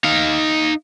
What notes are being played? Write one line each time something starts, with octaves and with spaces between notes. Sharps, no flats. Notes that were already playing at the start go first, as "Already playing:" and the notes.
D#4 F5